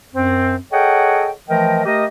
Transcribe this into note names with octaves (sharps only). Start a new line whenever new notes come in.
F#2 C4
G#4 A4 C#5 D#5 F#5 G5
E3 F3 A3 A#4 D#5 G5
A3 G4 A#4 D#5